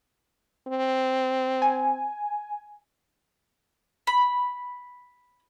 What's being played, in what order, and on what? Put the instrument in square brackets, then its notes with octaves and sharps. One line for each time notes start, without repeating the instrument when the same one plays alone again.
[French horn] C4
[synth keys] G#5
[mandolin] B5